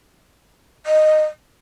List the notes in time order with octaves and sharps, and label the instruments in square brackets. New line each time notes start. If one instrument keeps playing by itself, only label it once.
[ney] D#5